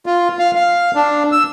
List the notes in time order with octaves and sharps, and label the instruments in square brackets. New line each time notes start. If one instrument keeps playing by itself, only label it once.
[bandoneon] F4
F5
F5
D4
E6